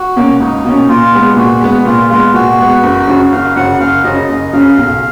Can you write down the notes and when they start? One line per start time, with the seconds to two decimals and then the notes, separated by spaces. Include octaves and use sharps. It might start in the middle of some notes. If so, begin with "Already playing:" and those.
Already playing: F#4
0.16 B2 A#3 C#4
0.40 C#2 D#4
0.65 B2 A#3 C#4
0.88 A#2 F4
1.13 G#3 B3
1.37 A#2 F#4
1.61 G#3 B3
1.85 A#2 F4
2.10 G#3 B3 F4
2.34 A#2 F#4
2.58 G#3 B3
2.83 F#1
3.07 F#2 C#3
3.32 F#1 F5
3.56 F#2 C#3 F#5
3.80 F#1 F5
4.04 F#2 C#3 D#5
4.29 F#1 D#5
4.53 F#2 C#3 F5
4.77 B1